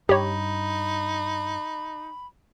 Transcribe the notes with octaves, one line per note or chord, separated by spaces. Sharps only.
G2 D#4 G4 C#5 B5